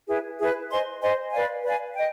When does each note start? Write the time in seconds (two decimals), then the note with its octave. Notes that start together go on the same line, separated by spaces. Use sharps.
0.07 E4 G#4 B4
0.38 E4 G#4 B4
0.70 C5 D#5 G#5 C6
1.01 C5 D#5 G#5 C6
1.32 B4 D5 F5 G#5
1.64 B4 D5 F5 G#5
1.95 D#5 G5